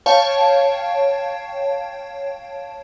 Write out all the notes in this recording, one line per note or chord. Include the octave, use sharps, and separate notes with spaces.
C#5 F5 G5 A5